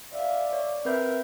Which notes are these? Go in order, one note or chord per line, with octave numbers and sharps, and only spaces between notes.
D5 E5 F5
C#5
C4 A#4 B4 E5 G6